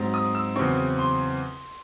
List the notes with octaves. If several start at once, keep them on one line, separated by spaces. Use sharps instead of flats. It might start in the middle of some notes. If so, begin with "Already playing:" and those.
Already playing: G#2 F#3 C4
D#6
E6
E2 C#3 F#3 C4 C#6
C6